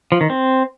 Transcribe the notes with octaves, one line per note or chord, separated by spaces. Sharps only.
F3
D#3
C4